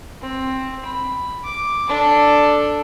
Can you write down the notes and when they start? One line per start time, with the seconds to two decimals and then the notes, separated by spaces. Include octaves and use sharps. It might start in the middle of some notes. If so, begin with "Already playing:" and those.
0.22 C4
0.85 B5
1.44 D6
1.89 D4 A4